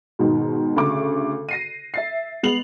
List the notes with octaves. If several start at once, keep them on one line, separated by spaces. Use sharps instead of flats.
G#2 B2 D#3
D2 C#3 C#6 D6
A#6 C7 D#7
E5 A6 C7
G#3 B3 C7 F7 F#7